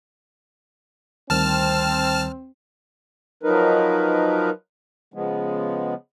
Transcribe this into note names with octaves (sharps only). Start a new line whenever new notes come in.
D2 D#3 G3 C4 A5 F6
F3 F#3 D#4 A#4 B4
C#3 F3 G#3 B3